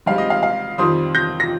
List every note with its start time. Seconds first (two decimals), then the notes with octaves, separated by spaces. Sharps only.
0.06 G#2 G3 C4 F5
0.18 D#5
0.30 F5
0.43 F5
0.78 F2 D#3 G3 C4 C6 D#6
1.15 G6 A#6
1.40 A#6